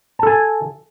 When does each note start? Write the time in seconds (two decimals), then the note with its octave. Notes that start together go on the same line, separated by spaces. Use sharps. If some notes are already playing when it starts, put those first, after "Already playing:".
0.19 A5
0.23 A4
0.27 G#5